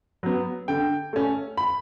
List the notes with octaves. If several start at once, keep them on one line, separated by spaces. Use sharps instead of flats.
F#3 B3
D3 G5
A3 C#4
B5